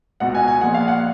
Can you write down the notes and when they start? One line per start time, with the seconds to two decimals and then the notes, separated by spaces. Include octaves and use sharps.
0.20 C#2 B2 F#5
0.35 G#5
0.48 G#5
0.61 A#1 A#2 F#5
0.74 F5
0.88 F#5